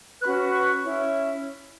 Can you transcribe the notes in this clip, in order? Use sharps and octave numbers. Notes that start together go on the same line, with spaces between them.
C#4 F#4 B4 C#6 F#6
C#6 F#6
C#4 E4 C#5